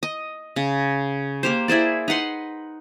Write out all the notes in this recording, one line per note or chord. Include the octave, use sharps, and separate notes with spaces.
D#5
C#3
A#3 G4 C5
E4 G#4 C5 D5
D#4 B4 F#5 C6